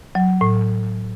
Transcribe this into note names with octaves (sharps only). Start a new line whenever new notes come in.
F#3
A2